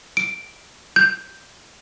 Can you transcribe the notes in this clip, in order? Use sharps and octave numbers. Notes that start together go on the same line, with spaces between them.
D7
G6